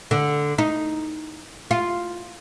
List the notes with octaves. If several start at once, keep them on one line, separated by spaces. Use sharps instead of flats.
D3
D#4
F4